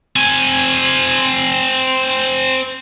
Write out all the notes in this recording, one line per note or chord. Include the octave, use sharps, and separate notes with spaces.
C4 G#5